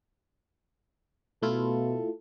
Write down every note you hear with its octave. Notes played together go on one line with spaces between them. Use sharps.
B2 A3 E4 F4 A4